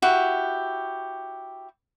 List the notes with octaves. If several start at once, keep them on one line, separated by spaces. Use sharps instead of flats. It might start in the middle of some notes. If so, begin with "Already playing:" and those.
E4 F#4 G4